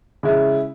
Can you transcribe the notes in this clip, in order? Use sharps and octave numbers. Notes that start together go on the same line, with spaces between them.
C#3 G#3 C#4 E4